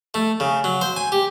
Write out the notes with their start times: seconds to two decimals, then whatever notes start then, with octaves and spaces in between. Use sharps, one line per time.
0.14 A3
0.40 C#3
0.64 F#3
0.81 C5
0.96 G#5
1.12 G4